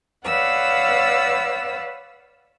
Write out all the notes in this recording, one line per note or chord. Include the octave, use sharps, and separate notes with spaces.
B4 C#5 D5 F5 F#5 E6